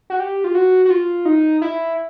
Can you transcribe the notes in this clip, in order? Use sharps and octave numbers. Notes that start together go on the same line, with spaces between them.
F#4
G4
F4
F#4
F#4
F4
D#4
E4